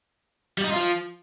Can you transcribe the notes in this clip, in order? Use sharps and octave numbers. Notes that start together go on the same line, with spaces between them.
G3
D#4
F4
F3